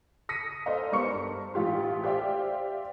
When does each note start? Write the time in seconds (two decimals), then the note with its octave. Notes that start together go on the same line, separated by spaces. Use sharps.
0.29 D#6 A#6 B6 C#7 D#7
0.66 A4 C5 D5 D#5 F5
0.92 G3 B3 A#4 C5 C#6 C#7
1.11 G2
1.54 A1 F4 G4 C6
2.04 G4 C5 D5 E5 F5 G5